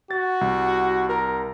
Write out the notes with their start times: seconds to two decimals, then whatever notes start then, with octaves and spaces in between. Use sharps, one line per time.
0.11 F#4 A6
0.41 C2
1.09 A#4